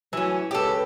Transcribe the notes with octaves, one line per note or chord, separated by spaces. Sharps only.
E3 F#3 A3 C#4 F#4
C#2 C#4 G4 A4 B4